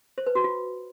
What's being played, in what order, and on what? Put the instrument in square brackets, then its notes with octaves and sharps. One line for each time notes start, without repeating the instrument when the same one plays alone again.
[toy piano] C5
B4
F#4
F4